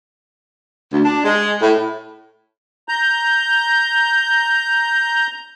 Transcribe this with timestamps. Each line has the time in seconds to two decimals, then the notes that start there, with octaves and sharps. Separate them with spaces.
0.93 D2
1.05 D4
1.24 G#3
1.62 A2
2.89 A#5 G6